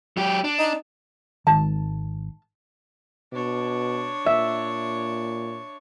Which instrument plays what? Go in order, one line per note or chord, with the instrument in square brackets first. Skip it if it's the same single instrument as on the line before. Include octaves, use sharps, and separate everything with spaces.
[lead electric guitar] F#3 G4
D4
[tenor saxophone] D#4
[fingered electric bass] G#1 D#3 [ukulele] A5
[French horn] B2 [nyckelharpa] D4 C#5
[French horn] A#2 [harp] E5